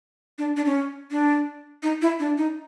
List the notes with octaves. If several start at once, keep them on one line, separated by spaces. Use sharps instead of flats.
D4
D4
C#4
D4
D#4
E4
D4
D#4